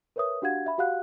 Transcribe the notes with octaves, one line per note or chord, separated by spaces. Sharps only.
A#4 B4 C#5 E5 D#6
D4 F#4 G4 F5 F#5 G#6
E5 B5
F#4 G4 F5 F#5 F#6